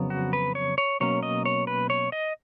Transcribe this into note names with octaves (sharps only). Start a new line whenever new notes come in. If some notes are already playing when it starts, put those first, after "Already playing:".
Already playing: F2 C#3 F#3 B3
F#4
B4
C#5
C#5
B2 F#3 A#3 C#4 C#5
D#5
C#5
B4
C#5
D#5